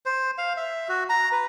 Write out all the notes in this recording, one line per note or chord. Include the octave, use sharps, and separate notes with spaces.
C5
F5
E5
F#4
A#5
B4